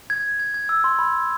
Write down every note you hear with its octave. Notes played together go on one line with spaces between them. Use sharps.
G#6
G#6
G#6
E6
C6
B5